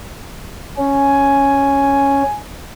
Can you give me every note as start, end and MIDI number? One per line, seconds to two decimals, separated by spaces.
0.78 2.23 61
0.78 2.39 80